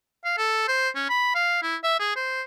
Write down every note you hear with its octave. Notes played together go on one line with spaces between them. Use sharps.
F5
A4
C5
C#4
B5
F5
E4
E5
G#4
C5